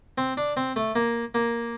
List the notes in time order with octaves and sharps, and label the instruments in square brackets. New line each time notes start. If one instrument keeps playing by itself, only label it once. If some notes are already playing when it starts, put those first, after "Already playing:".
[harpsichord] C4
D4
C4
A3
A#3
A#3